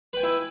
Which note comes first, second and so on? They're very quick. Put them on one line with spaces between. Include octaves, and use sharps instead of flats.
B4 G5 G#5 E4